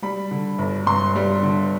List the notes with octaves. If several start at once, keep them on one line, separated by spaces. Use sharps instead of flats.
G3 B5
D3
G1
G2 C6
G3
D3